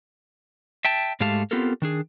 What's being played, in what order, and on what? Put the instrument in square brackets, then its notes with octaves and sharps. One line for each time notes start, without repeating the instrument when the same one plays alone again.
[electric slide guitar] E5 G5 A5
G#2 G#3 A3 G4 F5 A5
B3 C4 F4 G4 A4 A#4
D#3 D4 G#4